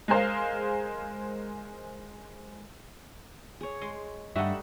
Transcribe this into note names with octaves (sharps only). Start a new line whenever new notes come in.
G#3 G#4 A#4 C5 F5
G#4 C#5
G#3 C6
G2 G3 A3 D#4 F#4 E5 F#5